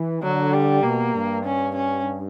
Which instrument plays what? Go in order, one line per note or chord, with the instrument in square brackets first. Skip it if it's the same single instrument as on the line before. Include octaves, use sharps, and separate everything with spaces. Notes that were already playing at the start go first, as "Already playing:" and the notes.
Already playing: [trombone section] E3
[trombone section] D3 [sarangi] F#3
[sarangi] G3
[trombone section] B2 [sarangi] A#3
[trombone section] G2
[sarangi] C#4
C#4